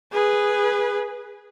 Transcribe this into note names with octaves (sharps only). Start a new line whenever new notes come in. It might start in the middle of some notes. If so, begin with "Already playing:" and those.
G#4 B4